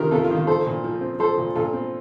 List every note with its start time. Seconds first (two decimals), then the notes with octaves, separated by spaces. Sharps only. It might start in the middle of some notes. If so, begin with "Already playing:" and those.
Already playing: C3 D#3 F4 G4 A#4
0.11 C3 F4 A4
0.24 F4
0.30 D#3
0.36 F4
0.47 F3 A4 C5
0.66 A#2
0.84 F3
1.01 C4
1.19 F3 A4 C5
1.38 A#2
1.55 A#2 F4 A4
1.73 C4